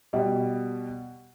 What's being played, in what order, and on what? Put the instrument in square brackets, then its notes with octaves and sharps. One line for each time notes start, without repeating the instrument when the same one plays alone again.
[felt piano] B2 G3